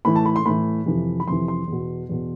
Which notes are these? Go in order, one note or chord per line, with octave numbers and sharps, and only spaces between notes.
A2 E3 B5
A5
B5
C6
A2 E3 B5
F2 C3 E3
B5
F2 C3 E3 C6
C6
E2 B2
E2 B2